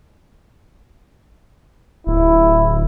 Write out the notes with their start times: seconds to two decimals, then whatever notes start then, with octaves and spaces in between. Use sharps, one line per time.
2.07 D1 E4